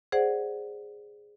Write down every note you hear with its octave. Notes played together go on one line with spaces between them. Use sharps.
G#4 C5 D5 F#5